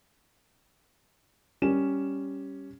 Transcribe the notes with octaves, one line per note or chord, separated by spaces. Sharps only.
G3 C#4 E7